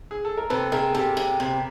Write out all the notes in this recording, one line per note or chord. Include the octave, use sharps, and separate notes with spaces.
G#4
A4
A#4
C3 A4 B4
C3 G#4 A#4
C3 G4 A4
C3
C3